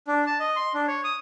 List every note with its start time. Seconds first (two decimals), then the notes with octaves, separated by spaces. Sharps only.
0.08 D4
0.26 A5
0.40 D#5
0.56 C6
0.74 D4
0.88 C#5
1.04 D#6